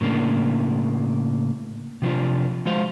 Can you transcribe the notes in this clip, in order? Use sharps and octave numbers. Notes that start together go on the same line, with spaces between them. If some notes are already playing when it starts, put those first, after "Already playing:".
A2 C#3 A#3 D4
C3 F3 D4 F4
F3 G#3 F#4 C5 F5